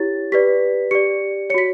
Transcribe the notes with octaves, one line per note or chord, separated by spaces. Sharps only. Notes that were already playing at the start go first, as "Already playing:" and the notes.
Already playing: E4 G4 C#5 A6
G4 B4 D5 B6
G4 D5 C#7
F#4 C#5 B6 C#7